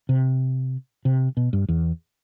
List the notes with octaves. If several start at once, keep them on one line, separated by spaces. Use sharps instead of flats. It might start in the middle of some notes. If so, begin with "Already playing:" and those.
C3
C3
B2
G2
E2